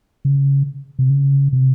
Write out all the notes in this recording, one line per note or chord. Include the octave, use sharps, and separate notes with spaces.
C#3
C3
C#3
C3